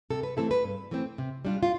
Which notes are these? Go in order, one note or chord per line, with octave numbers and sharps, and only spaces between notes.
C3 A4
B4
E3 A3 C4 E4 A4
B4
G2
E3 A3 C4
C3
G3 D4 F4
F4